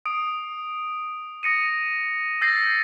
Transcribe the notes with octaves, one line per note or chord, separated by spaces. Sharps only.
D#6 D7
D#6 A#6 C#7 D#7
E6 G6 A6 A#6 C7